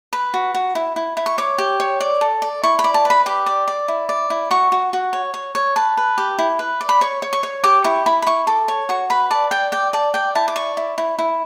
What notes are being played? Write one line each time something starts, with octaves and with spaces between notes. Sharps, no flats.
B4 B5
F#4
F#4
E4
E4
E4
C#6
C#5 D6
G4
C#5
D5
A4
D5
E4 C#6
B5
D5
A5
B4 B5
G4 D6
D5
D5
E4
D5
E4
F#4 C#6
F#4
F#4
C#5
C#5
C#5
B4 A5
B4
G4
E4
B4
D5
B5
C#5 C#6
C#5
C#6
C#5
G4 D6
E4 C#6
E4 B5
B5
E4 C#6
A4 D6
C#5
F#4 C#6
B4 B5
D5 A5
D5 G5
D5 G5
D5 A5
D5 G5
E4 A5
D6
D5 C#6
E4
E4
E4